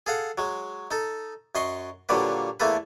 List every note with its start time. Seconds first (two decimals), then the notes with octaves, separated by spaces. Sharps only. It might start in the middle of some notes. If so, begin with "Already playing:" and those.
0.06 G#4 A4 F5 F#5
0.38 F#3 G#3
0.91 D#4 A4
1.55 F#2 D#5 C6 C#6
2.09 A#2 D3 F#3 G3 A#3 B4
2.60 E2 A3 A#3 A4 B4